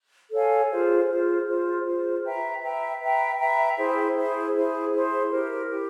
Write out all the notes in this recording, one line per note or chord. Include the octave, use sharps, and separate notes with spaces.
A4 C#5 F5 G#5
F4 G#4 C5
F4 G#4 C5
F4 G#4 C5
F4 G#4 C5
B4 E5 G5 A#5
B4 E5 G5 A#5
B4 E5 G5 A#5
B4 E5 G5 A#5
E4 G#4 C5 E5
E4 G#4 C5 E5
E4 G#4 C5 E5
E4 G#4 C5 E5
E4 G4 A#4
E4 G4 A#4